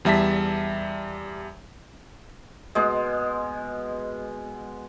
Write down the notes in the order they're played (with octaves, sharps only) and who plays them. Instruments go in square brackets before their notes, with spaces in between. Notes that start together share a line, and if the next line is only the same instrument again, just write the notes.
[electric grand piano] E2 G3 E5 A5 B6
[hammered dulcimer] B2 G#3